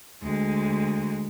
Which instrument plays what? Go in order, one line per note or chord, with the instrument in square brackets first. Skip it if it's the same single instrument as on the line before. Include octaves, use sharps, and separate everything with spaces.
[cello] D2 G#3